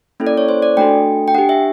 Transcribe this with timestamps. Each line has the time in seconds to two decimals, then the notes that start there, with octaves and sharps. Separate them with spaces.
0.20 A#3 C#4 E4 A4
0.27 D5
0.37 C#5
0.49 C5
0.62 D5
0.77 A3 D4 F#4 A4 G5
1.28 G5
1.34 D4 G4 F#5
1.49 E5